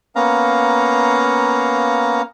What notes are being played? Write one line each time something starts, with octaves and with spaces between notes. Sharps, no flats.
A#3 B3 C#4 F5 A#5